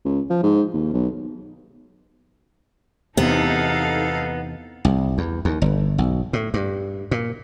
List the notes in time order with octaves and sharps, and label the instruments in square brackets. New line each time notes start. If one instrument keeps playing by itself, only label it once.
[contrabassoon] C#2
F3
G#2
D#2
B1
[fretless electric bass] E2 C3 [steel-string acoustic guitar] B3 [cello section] D#4 A4 F5
[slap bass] C2
E2
D#2
G1
B1
A2
G2
A#2